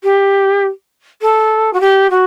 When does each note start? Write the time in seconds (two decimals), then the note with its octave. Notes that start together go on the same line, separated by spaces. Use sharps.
0.03 G4
1.21 A4
1.73 F#4
1.80 G4
2.10 F#4